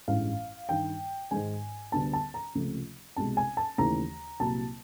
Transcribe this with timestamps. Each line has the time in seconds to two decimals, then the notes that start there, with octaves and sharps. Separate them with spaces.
0.08 A1 G2 E3 G#3 F5
0.69 G2 D#3 G3 G5
1.31 G#2 D#3 G#3 G#5
1.92 D2 D3 G3 B3 D4 A5
2.13 A5
2.34 A#5
2.55 C#2 C3 F3 A3
3.16 C2 B2 G#3 A5
3.37 G#5
3.57 A5
3.78 D#2 C#3 E3 A3 A#5
4.40 C2 A#2 F#3 A#3 A5